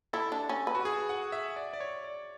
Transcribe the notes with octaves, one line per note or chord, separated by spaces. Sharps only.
E4 A4
D4
C#4
B4
F#4
G#4
F#5
E5
D5
D5
C#5
D5